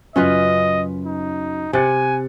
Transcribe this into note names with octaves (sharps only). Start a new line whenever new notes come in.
F#2 C#3 F#3 C#4 F4 B4 D#5
D#4
C3 G#5 F#6 A6 C#7